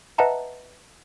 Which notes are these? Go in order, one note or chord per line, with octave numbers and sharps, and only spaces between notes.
B4 D#5 E5 F#5 A5 A#5